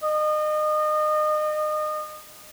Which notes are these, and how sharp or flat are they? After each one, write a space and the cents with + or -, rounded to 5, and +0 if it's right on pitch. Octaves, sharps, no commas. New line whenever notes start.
D#5 -30